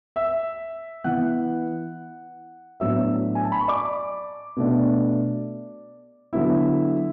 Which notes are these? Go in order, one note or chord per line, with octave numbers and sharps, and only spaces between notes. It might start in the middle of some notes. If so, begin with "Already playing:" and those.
E5 E6
E3 B3 E4 F#5 F#6
A2 F#3 B3 D4 E5 E6
G#5
A5
B5
C#6
D5 D6
B2 A3 D4
D3 F#3 B3 E4 E5